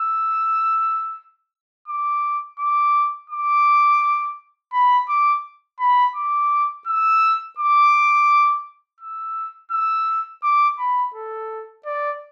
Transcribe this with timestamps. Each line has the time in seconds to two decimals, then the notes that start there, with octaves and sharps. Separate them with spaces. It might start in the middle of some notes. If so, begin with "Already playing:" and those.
Already playing: E6
1.88 D6
2.59 D6
3.30 D6
4.73 B5
5.08 D6
5.80 B5
6.15 D6
6.87 E6
7.58 D6
9.00 E6
9.71 E6
10.43 D6
10.79 B5
11.14 A4
11.85 D5